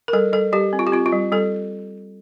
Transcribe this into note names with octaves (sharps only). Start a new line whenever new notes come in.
A#4
G3 A4
G3 A4
G3 G4
C4
F4
G4
C4 F4
F4
G3
G3 A4